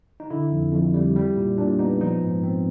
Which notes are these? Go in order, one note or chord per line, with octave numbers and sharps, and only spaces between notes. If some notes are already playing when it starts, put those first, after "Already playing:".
D#4
D3 E4
F2
F2
G3
G3
A#2
A#2 D4
B3 D#4
F3 D#4
G#2
C4